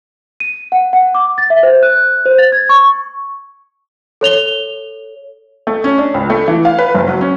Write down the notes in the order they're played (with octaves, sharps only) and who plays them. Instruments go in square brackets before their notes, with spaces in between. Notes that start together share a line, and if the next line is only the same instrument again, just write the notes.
[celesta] D#7
F#5
F#5
D6
A6
E5
C5
F#6
C5
A6
G#6
C#6
A4 C#5 F7 G7
[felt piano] A3
C#4
D4
C#2
A3
E3
F5
B4
F#1
F#3
C#4